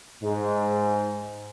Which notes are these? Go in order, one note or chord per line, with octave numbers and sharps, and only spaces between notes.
G#2